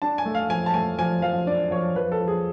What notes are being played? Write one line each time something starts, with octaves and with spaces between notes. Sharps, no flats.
D4 A5
G#5
A3
F5
F3 G#5
A5
A3 G#5
F3 G#5
F3 F5
D4 D5
F3 C#5
F3 B4
A4
F3
G#4